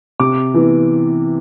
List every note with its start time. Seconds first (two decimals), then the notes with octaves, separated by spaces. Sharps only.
0.20 C3 D6
0.54 E3 B3